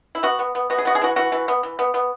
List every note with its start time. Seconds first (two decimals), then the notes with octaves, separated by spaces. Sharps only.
0.15 E4
0.23 B3 F#4
0.39 B3
0.55 B3
0.70 B3 F#4
0.78 G#4
0.85 B3 F#4
0.95 G#4
1.01 E3 F#4
1.16 E3 F#4
1.32 E3
1.48 B3
1.63 E3
1.79 B3
1.94 B3